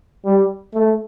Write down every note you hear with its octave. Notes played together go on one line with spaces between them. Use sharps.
G3
A3